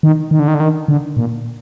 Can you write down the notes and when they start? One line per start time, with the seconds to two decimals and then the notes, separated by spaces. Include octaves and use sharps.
0.03 D#3
0.31 D#3
0.40 D3
0.48 D#3
0.55 D3
0.60 D#3
0.88 D3
1.17 A#2